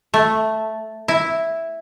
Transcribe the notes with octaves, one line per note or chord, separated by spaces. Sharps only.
A3
E4